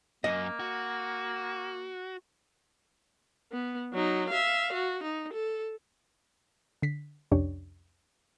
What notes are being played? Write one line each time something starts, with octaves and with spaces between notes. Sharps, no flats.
F#2 A#3 D#5
F#4
B3
F#3 D#4
E5 F5
F#4
D#4
A4
D3 B6 C7
C2 F2 C#4 D4 G4 C#5